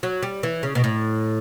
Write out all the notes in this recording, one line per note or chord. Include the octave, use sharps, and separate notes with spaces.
F#3
G3
E3
C#3
B2
A2